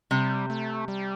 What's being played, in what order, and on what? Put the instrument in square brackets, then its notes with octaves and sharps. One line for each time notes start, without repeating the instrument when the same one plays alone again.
[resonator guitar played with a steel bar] C3 [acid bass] G3
[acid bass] A3
G3